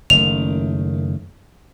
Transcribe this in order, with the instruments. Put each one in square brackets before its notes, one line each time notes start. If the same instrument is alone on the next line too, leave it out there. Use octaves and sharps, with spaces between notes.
[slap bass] F#1 D#3 A3 [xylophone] F7